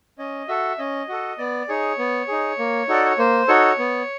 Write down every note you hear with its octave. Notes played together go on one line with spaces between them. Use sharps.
C#4 D#5
F#4 A4 E5
C#4 D#5
F#4 A4
B3 D5
D#4 G#4 C#5
B3
D#4 G#4
A#3
D#4 F#4 A4 D5
C#5
A#3 C5
D#4 F#4 A4 C#5
B3